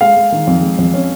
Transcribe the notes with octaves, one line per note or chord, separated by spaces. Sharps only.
G#3 F5
G#3
D#3
F2
G#3
F2
C#4